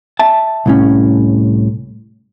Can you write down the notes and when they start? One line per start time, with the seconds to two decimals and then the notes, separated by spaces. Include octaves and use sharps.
0.19 E5 A5
0.66 C2 A2 C#4